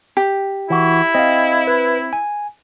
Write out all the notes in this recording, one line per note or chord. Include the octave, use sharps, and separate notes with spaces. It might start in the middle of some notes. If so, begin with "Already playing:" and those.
G4
E3 E4 F#4
C4 D#5 F5
B4
G#5